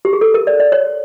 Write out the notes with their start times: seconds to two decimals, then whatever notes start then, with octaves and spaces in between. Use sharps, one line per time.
0.05 G4
0.13 G#4
0.21 A4
0.34 A#4
0.47 D5
0.60 D5
0.72 C#5